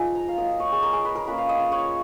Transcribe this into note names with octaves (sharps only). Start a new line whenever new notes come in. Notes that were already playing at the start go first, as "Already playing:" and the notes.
Already playing: F3 G#3 D#4 F4 G#5
A#5
F5
F#3 A#3 F4 D#5
C#5
G#4
A#4
G#4
B4
A#4
A#3 C#4 F4 B4
F5
D#5
C#5